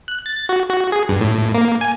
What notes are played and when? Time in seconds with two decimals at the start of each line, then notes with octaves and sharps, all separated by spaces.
0.08 F#6
0.26 A6
0.49 F#4
0.70 F#4
0.92 G#4
1.09 G2
1.21 A2
1.54 A#3
1.81 G#5